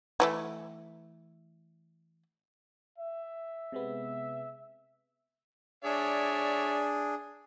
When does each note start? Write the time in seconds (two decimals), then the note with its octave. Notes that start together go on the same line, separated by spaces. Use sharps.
0.20 E3 F3 A3
2.98 E5
3.72 C3 G#3 B3
5.84 D4 G#4 C#5 D5 E5